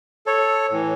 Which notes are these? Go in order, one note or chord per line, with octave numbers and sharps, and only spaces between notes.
A4 C#5
A2 E3